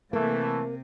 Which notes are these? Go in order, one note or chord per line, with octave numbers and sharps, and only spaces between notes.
C3 E3 A3 A#3